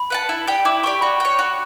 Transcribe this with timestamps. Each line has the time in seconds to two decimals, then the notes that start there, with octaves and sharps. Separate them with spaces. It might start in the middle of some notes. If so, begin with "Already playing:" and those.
Already playing: B5
0.10 B4 F#5 A5
0.29 E4
0.47 G4 D5 G5
0.65 E4 D6
0.83 G4 D5 G5 C#6
1.01 F#4 B5
1.20 C#5 G5
1.39 F#4